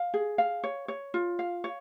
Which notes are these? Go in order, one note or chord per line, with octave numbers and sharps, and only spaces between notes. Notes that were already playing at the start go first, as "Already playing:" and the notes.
Already playing: F5
G#4
F5
C#5
C#5
F4
F5
C#5